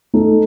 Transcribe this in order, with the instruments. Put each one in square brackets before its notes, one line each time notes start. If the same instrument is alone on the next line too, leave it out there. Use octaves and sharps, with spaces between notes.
[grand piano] A3 D#4 A4